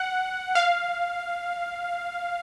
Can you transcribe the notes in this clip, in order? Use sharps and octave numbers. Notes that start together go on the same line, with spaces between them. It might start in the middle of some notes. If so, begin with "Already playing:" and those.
Already playing: F#5
F5